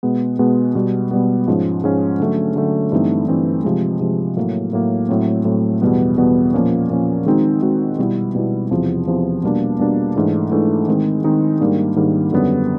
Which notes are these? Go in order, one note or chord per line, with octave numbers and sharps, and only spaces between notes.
B2 G#3 B3
B2 G#3 B3
B2 G3 B3
B2 G3 B3
G#2 F3 G#3 C#4
G#2 F3 G#3 C#4
D3 F#3 A3 C#4
D3 F#3 A3 C#4
G2 E3 A3 C4 D#4
G2 E3 A3 C4 D#4
C3 F3 G#3
C3 F3 G#3
A2 F#3 A#3
A2 F#3 A#3
A2 F#3 A3 C4
A2 F#3 A3 C4
E2 B2 G3 B3
E2 B2 G3 B3
A#2 F3 A#3 C#4
A#2 F3 A#3 C#4
D#3 G#3 C4 D#4 F#4
D#3 G#3 C4 D#4 F#4
B2 G3 B3 E4
B2 G3 B3 E4
E2 C3 F3
E2 C3 F3
B2 G3 A#3 D4
B2 G3 A#3 D4
G#2 E3 A3 D4
G#2 E3 A3 D4
D#3 G#3 C4 D#4
D#3 G#3 C4 D#4
G#2 D#3 G3 A#3 D4
G#2 D#3 G3 A#3 D4
F#2 D3 G3 B3